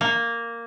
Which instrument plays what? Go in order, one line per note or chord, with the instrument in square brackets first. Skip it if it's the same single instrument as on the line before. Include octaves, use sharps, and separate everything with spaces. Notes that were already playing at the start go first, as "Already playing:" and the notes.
[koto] A#3